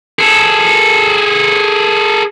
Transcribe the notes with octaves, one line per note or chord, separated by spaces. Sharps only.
G#4 A4